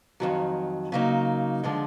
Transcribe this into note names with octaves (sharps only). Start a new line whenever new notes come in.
F2 C3 D#3 F#3
C#3 F#3 A#3 D#4
D3 F3 G#3